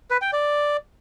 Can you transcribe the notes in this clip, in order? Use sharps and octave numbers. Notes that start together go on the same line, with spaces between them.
B4
G5
D5